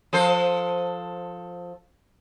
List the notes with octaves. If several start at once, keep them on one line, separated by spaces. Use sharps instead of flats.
F3 A4 C5